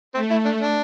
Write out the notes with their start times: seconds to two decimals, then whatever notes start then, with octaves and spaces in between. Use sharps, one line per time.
0.14 A3 C4
0.30 E4
0.45 D4
0.61 D4